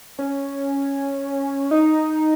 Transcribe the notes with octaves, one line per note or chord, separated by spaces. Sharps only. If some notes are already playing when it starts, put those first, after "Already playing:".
C#4
D#4